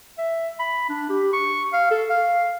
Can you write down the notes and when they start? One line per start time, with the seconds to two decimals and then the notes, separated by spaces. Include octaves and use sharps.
0.18 E5
0.60 B5
0.89 D4
1.10 G4
1.33 C#6
1.73 F5
1.91 A4
2.10 F5